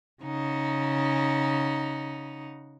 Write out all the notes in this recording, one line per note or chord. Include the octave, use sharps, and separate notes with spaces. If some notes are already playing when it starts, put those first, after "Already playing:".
C#3 D#4 F#5